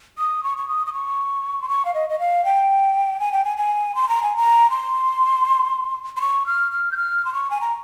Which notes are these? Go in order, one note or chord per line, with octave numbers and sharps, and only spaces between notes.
D#6
C#6
C#6
D#6
D#6
C#6
C6
C#6
F5
D#5
D#5
F5
G5
G#5
G5
G#5
G#5
C6
A#5
G#5
A#5
C6
C6
C#6
F6
F6
G6
F6
C6
C#6
G#5
A#5